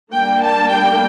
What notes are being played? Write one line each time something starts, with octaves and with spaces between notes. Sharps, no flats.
G3 A#3 D4 G5
A5
G5